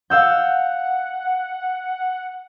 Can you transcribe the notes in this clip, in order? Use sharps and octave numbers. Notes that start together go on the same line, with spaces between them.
F5 F#5 E6 G6